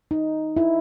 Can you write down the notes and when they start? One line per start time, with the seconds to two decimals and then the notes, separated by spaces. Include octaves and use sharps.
0.11 D#4
0.57 E4